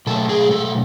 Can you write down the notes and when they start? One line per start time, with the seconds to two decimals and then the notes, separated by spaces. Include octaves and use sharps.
0.07 B2 F#3 A3 A4
0.29 G#4
0.51 A4